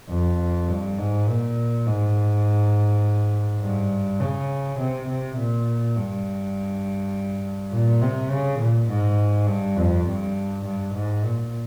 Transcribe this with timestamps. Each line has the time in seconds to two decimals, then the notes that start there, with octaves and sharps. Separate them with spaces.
0.10 F2
0.68 G2
0.99 G#2
1.27 A#2
1.87 G#2
3.61 G2
4.20 C#3
4.79 C3
5.08 C3
5.37 A#2
5.97 G2
7.72 A#2
8.02 C3
8.31 C#3
8.60 A#2
8.89 G#2
9.47 G2
9.77 F2
10.07 G2
10.65 G2
10.94 G#2
11.24 A#2